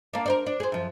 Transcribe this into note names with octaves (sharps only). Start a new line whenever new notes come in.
A#3 D4
A#4 C5 D5
D4
G#4 C5
F#2 F3